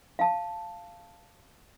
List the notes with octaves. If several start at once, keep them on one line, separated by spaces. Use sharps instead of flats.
F5 A5